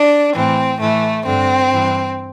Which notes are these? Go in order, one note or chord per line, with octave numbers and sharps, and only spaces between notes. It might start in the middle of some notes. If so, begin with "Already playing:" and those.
Already playing: D4
A2 E3 C4
A2 E3 A3
G2 D3 C4
G2 E3